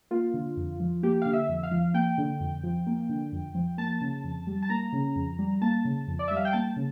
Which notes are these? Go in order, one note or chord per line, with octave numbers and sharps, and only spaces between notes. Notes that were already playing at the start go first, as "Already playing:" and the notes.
A#3 F4
D3
F2
F3
A#3 G4
D3 F5
E5
F2
F5
F3
A#3 G5
D3
F2
F3
A#3
D3
F2
F3
A#3 A5
C#3
F2
G3
A5
A#3 A#5
C#3
F2
G3
A#3 A5
C#3
F2
D5
G3 E5
F5
G5
A#3 A5
C#3